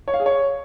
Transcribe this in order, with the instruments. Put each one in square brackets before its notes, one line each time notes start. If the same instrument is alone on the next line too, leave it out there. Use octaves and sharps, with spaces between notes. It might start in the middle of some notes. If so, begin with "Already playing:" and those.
[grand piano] C#5
F5
G#4
C#5